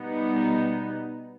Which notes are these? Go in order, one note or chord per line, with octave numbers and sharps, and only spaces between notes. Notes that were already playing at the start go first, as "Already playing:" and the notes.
Already playing: B2 G3 B3 D#4